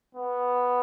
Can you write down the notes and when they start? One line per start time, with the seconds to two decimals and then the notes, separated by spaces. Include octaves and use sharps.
0.15 B3